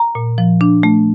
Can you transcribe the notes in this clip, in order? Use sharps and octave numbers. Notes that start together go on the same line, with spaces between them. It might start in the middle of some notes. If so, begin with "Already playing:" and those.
Already playing: A#5
A#2
F3
D4
A3